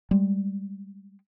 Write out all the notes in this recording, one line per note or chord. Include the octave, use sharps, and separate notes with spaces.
G3 G#3